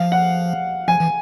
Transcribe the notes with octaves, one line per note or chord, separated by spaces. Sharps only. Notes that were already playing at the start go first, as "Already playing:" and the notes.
Already playing: F3 F5
F#5
F3 G#5
E3